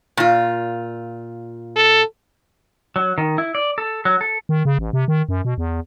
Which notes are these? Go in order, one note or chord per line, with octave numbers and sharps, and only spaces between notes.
A#2 F4
A4
F#3
D#3
E4
D5
A4
F#3
A4
D#3
C#3
A1
C3
D#3
F#2
B2
E2